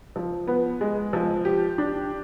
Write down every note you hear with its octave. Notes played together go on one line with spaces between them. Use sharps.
F3
B3
G#3
F3
G4
D4